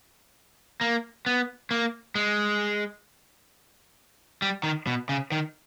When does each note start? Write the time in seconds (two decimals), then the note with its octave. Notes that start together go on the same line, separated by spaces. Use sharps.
0.81 A#3
1.26 B3
1.71 A#3
2.15 G#3
4.42 G3
4.63 D#3
4.87 B2
5.09 C#3
5.32 D#3